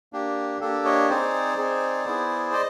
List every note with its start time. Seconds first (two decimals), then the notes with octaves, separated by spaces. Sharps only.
0.13 A#3 D4 G4
0.61 A#3 D4 G4 A4
0.85 C#5 D#5
1.09 C4 D#4 G#4 C5 D5
1.57 C4 D#4 G#4
2.06 B3 E4 G#4
2.54 D#5